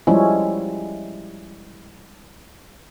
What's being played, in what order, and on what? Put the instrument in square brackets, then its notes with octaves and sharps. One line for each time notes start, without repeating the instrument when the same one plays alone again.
[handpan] F3 G3 G#3 C#4 E4